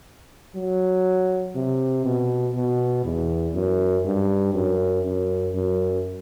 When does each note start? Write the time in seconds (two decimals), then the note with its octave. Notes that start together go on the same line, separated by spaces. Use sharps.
0.55 F#3
1.55 C3
2.05 B2
2.55 B2
3.04 E2
3.54 F#2
4.05 G2
4.54 F#2
5.04 F#2
5.54 F#2